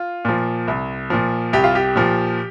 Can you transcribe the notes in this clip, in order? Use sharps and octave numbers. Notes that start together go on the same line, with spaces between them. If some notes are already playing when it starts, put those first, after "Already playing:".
Already playing: F4
A#2 F3
C2
A#2 F3
C2 G4
F4
G4
A#2 F3